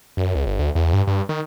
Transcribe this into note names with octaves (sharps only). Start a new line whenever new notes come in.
F#2
C#2
G1
D2
E2
G2
G2
D#3